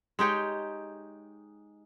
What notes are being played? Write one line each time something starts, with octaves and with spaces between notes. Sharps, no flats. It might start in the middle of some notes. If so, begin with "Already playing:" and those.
G#3 D#4 G4 C#5